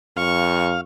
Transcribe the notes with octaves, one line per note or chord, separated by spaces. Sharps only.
F2 F5 C#6